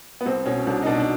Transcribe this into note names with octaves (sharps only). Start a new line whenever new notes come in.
B3
C2 C4
B2 C#4
C2 D4
D#4
B2 D4
D4